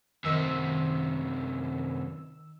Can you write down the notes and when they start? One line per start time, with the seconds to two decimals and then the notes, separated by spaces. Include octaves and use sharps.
0.24 F#2 C3 D#3 E6